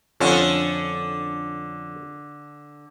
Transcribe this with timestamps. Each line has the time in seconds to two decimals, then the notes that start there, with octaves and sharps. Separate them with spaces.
0.20 F2 D3 C#4 F4 A4